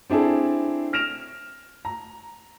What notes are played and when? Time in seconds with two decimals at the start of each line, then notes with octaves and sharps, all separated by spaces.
0.10 C4 D4 E4 G#4 A4
0.93 F6 A#6 D7 E7 F7
1.85 A#5